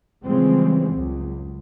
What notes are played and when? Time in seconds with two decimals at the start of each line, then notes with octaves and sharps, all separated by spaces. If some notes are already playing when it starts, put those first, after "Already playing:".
0.25 C#3 E3 F3 G3 G#3 C4
0.90 C#2 F#2